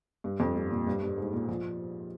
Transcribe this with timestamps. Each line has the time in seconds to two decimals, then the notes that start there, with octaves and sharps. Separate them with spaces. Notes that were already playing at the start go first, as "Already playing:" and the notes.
0.24 G2
0.40 F2
0.56 G2
0.71 A#2
0.87 G2
1.02 G2
1.18 G#2
1.33 A#2
1.48 F3